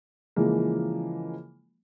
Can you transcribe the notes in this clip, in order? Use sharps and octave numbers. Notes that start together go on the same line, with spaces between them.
C#3 E3 F3 G#3 A#3